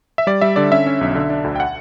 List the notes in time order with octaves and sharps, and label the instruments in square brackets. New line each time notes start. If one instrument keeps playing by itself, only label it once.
[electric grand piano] E5
G3 D5
G3 E5
D3 D5
C#4 E5
C#4
B1
D3
D4
D2
G5
F#5